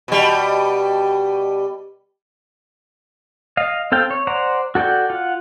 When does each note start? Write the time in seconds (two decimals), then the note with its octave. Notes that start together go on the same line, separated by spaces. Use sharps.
0.08 B2 G3
3.57 D#5 F5
3.92 C4 A4 F5 G5
4.11 C#5
4.27 C5 D5 F#5 A#5
4.75 F#4 A4 D5 F#5 G5
5.10 F4 F#5